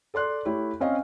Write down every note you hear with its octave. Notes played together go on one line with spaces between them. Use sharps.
A4 D5 C6 F#6
A3 E4 G4 C#5
C4 C#4 D#5 F5